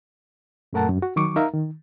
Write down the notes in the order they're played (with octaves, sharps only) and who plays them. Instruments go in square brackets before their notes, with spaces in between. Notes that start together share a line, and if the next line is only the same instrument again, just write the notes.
[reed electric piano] F#2 A#2 A3 A#4 F#5 A5
F#2
F#4
D#3 F#3 C#6 D6
D#4 A#4 E5 F5 A#5
D#3